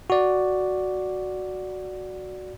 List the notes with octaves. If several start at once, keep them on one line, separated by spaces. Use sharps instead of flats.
F#4 D5